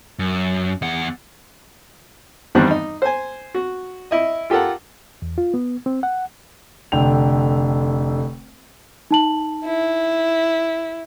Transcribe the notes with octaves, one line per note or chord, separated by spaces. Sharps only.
F#2
E2 F#5
E2 G2 D#3 G3 C4 F#6
D#4
C5 G#5
F#4
E4 D#5
F4 G4 A4 A#4 F#5
E2
F4
B3
C4
F#5
F1 D3 G5 F7
D#4 A5 F#7
E4